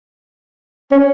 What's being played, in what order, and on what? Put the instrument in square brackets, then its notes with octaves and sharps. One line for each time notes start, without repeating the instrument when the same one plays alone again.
[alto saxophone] C#4